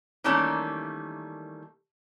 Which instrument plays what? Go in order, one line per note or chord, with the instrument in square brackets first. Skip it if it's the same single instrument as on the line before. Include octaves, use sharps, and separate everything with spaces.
[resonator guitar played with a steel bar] D#3 E3 G3 A3 A#3 C#4